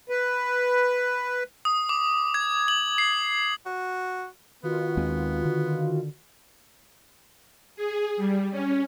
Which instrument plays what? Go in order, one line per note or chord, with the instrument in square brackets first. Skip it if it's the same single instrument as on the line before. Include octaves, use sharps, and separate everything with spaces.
[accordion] B4
[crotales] D#6
D6
G#6
F#7
C7
[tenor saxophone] F#4
[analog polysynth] D#3 F4 F#4 [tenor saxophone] B3
[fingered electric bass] D#2 G#3 C4
D3
[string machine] G#4
G3
C#4